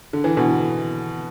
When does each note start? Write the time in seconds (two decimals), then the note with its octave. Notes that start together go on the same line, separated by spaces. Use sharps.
0.13 D3
0.24 E3
0.37 B2 D3